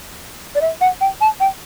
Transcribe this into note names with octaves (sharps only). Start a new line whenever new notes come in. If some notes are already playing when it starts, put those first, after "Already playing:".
D5
E5
F#5
G5
A5
G5